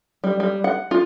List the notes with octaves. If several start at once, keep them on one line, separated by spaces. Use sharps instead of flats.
G3
G3
F#5
F4